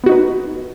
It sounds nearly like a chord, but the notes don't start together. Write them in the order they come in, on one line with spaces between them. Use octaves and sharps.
B3 F#4 D#4 B4